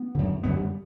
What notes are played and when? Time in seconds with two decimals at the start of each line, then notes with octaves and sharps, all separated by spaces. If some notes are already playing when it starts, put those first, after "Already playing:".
Already playing: B3
0.15 F#2 D3
0.43 F#2 D3 B3
0.53 G3